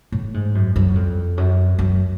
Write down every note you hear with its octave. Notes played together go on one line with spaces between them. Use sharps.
A2
G#2
F#2
F#2
F2
F#2
F#2